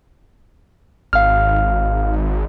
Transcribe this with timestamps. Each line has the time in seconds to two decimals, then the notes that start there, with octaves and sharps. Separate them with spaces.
1.13 G#1 F5 F6